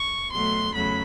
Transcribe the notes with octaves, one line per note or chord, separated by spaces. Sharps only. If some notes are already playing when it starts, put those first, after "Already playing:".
Already playing: C#6
B2 F#3 A3 C6
E2 C#3 F#3 A3 B5